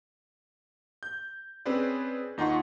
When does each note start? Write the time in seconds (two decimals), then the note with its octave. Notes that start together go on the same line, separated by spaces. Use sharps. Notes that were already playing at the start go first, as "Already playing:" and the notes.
1.03 G6
1.65 C4 C#4 G#4 B4 C5 D5
2.38 D#2 D#4 F4 F#5 C6 C#6